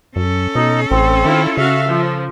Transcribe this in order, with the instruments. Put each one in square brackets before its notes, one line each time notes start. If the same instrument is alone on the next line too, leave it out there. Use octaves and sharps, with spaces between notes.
[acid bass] F#2 [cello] C#4 A4
[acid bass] B2 [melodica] D#4 D#5
[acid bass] A1 [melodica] C4
[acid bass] D#3 [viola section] E4 F4
[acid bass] C#3 [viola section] F#4 F5 [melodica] E5
[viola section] F3